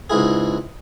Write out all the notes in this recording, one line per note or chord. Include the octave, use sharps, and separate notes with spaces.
C#2 G#2 E4 G#4